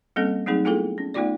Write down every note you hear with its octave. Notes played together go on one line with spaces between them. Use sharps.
G3 A#3 C4 C#4 A4
F#3 A3 C4 D#4 G#4
A3 B3 E4 F4 G#4 A4
C#4
A3 B3 D#4 F4 G4 D5